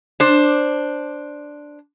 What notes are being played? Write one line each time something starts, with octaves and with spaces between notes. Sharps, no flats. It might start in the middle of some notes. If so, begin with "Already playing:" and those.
D4 C5